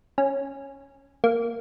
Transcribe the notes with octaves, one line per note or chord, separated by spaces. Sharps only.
C#4
A#3